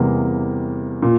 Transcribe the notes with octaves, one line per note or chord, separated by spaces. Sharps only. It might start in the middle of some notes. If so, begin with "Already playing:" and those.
Already playing: E2 C3 E3 G3 A#3
A#2